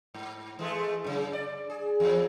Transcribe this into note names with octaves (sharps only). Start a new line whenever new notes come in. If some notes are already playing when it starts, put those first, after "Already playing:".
G#2
E3 G#3 A3
F#2 C#3
D5
G#4
E2 F3